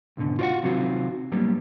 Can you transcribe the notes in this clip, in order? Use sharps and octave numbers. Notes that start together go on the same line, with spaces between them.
C#2 G#2 B2 D3
F4 F#4 A#4 D5 F5 F#5
C3 D#3 F#3 C4 F4 F#4
G2 F#3 G3 A#3 B3